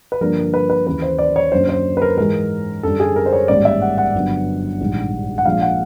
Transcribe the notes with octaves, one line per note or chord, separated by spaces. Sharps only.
B4
G2 D3 F3 A#3 A#4
A#4
B4
B4
D#2 C#3 E3 B4
C5
D5
C#5
F#2 D3 F#3 A#3 C#4 C5
C5
B4
A#4
G#2 E3 G#3 A#4
F#2 D3 G3 A4
G#4
A#4
C5
C#5
A1 G#2 D#3 G3 A#3 D5
E5
F#5
F#5
G1 G2 D3 F#3 B3
A#1 G#2 D#3 G3
F#5
A#1 A#2 F3 G#3 F5
F#5